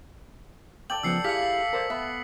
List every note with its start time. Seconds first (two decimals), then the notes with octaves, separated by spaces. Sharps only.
0.90 A4 D5 G5 F#7
1.03 C#3 F3 B3 E6 C7 C#7
1.24 E4 G4 G#4 F5 B6 C#7
1.73 A#4 C5 D5
1.90 B3 E5